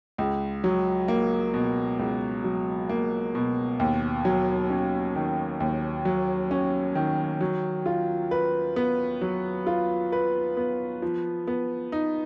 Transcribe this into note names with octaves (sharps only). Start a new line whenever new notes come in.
C#2
F#3
A#3
B2
C#2
F#3
A#3
B2
D#2
F#3
C#4
D#3
D#2
F#3
C#4
D#3
F#3
F4
B4
B3
F#3
F4
B4
B3
F3
B3
D#4